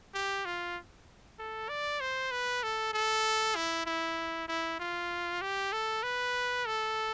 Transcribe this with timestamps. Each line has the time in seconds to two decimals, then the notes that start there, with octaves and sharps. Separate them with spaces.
0.15 G4
0.46 F4
1.39 A4
1.69 D5
2.01 C5
2.32 B4
2.63 A4
2.93 A4
3.56 E4
3.86 E4
4.48 E4
4.80 F4
5.42 G4
5.73 A4
6.03 B4
6.66 A4